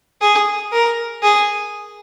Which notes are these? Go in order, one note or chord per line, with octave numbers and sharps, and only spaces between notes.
G#4
A#4
G#4